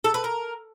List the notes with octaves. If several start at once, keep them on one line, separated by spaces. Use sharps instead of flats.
A4
B4
A#4